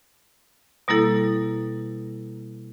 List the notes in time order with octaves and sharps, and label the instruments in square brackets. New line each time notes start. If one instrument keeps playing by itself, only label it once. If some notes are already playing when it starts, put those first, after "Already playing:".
[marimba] B2 G3 A#3 E4 A4